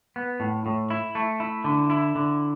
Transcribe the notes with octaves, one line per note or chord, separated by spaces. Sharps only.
B3
A2
A2
E4
A3
E4
D3
E4
D3